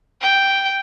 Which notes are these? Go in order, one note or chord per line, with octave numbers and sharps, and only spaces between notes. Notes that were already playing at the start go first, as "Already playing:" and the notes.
G5